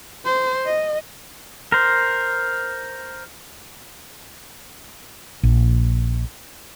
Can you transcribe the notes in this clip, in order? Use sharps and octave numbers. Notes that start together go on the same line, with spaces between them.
C5
D#5
A#4 C5
A#1